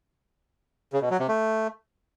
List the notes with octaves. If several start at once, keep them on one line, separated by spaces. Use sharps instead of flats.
C#3
B2
F#3
C3
A3